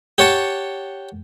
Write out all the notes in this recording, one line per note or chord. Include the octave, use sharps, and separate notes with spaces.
G4 C#5 F#5 A5